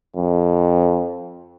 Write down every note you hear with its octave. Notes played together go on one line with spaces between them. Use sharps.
F2